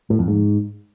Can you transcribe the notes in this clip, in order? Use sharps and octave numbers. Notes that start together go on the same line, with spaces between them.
A2
F2
G#2